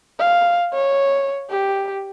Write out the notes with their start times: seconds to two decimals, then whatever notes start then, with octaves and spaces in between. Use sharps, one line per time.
0.19 F5
0.73 C#5
1.50 G4